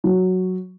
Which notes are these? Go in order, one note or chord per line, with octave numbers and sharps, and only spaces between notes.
F#3